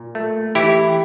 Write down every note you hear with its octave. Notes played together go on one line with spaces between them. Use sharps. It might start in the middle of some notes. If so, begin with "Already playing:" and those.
Already playing: A#2
A3
E3 E4 G4